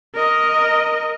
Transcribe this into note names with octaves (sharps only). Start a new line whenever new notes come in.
A#4 D#5